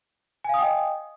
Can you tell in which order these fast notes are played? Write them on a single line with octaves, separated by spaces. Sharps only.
G#5 F5 D#6 G5 D#5